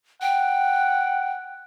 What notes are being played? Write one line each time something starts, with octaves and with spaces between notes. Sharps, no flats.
F#5 G5